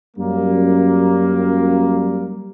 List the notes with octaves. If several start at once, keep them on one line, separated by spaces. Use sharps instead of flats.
F#2 G3 A#3